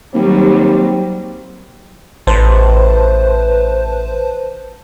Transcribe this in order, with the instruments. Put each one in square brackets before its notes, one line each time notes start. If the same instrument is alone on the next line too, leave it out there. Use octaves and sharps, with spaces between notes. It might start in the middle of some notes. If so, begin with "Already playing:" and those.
[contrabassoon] D#2 [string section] F#3 G3 [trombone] C4
[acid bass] A1 [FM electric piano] B4 C5 A5